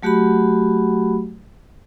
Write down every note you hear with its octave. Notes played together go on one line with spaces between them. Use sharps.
F#3 A3 F#4 G4 F#5 B5